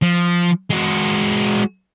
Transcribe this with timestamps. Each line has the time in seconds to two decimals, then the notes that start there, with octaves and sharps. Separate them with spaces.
0.02 F3
0.71 G#3 F#4